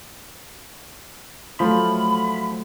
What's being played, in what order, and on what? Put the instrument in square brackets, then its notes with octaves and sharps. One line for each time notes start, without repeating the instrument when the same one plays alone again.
[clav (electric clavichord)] F3 [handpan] F#3 A3 F4 [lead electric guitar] B5